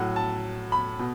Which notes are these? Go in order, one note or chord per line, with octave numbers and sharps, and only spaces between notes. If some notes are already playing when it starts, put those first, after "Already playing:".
Already playing: A2 F#3 F#5
A5
B5
B2